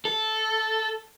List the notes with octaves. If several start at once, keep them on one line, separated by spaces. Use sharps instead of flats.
A4